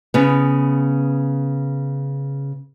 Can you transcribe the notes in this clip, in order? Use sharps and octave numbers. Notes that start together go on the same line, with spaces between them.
C#3 B3